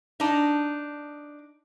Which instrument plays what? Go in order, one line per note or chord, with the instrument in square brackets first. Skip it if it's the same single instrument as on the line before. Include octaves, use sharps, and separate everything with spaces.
[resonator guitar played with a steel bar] D4 D#4